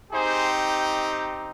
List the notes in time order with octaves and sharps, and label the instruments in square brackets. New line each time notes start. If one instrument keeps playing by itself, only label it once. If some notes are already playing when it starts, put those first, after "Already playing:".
[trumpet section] C4 D#4 G4 G#4 C5